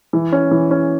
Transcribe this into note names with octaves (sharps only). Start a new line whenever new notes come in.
E3
C#4
E3
C#4